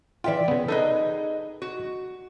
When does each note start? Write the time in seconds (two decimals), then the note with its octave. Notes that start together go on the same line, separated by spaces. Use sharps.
0.24 E3 F4 D5 E5 G5
0.48 C#3 B3
0.68 D#4 G#4 A4 B4 D#5
1.62 F#4